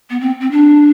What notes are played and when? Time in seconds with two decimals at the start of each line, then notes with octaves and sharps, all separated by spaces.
0.10 B3
0.21 C4
0.41 C4
0.51 D4